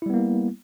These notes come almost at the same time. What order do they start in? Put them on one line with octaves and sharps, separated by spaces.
E4 G3 B3 A#3